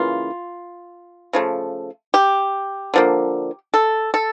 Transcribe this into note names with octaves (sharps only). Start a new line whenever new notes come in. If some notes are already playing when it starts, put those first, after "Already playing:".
Already playing: C#3 E3 A#3 F4
C#3 F3 A3
G4
D3 F3 A#3
A4
A4